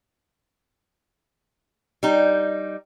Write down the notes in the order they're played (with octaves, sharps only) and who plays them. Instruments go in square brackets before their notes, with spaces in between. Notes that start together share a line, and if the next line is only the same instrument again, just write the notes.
[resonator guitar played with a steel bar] G3 D#4